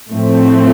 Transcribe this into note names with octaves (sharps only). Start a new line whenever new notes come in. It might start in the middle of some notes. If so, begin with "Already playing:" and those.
A2 F3 A3 C4